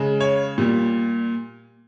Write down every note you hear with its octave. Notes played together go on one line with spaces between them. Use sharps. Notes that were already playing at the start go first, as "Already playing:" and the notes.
Already playing: C#3 G#3
C#5
A#2 G3